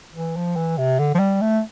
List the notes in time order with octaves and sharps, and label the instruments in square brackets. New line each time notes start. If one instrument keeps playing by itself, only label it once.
[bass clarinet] E3
F3
E3
C3
D3
F3
G3
A3